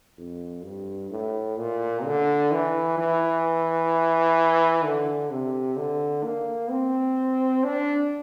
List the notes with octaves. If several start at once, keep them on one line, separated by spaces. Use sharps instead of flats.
F2
G2
A2
A#2
D3
E3
E3
D3
C3
D3
A#3
C4
D4